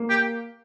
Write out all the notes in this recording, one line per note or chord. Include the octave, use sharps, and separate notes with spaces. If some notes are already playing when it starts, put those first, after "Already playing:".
Already playing: A#3
G4